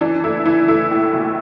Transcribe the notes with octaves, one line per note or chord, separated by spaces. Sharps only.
E3 D4
A3 E4
E3 E4
A3 E4
A2
B1